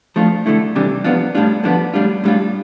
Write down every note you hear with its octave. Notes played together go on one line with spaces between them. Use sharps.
F3 A3 D4 F4
D3 A3 E4
C3 E3 G3 D4
F3 B3 D4 F4
A2 G3 D4 F4
D3 F3 B3 D4
A2 G3 D4 F4
A2 G3 D4 F4